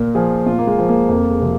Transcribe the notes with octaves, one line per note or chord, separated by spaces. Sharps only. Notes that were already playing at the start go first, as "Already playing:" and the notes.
Already playing: A#2 A#4
F3 G#4
A#2 F4
A#3
G#3
F3
A#3
F2 A#3
G#3
C3 F3